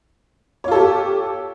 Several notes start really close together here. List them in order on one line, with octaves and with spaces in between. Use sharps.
C#5 F4 A4 G4